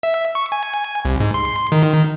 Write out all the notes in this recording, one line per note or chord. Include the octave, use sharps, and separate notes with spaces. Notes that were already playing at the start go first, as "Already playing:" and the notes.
E5
C#6
G#5
C2
G#2
C6
D#3